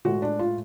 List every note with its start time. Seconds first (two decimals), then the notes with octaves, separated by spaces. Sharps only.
0.05 A2 G#3 F#4
0.22 D4
0.39 F4